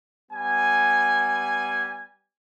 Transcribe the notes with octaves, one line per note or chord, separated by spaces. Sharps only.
G3 B3 G#5